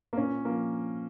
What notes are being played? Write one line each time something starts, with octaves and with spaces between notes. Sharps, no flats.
A#3
A#2 C#4
F3 A#3